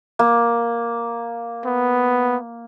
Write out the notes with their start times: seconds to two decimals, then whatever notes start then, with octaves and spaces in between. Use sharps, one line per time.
0.19 A#3
1.66 B3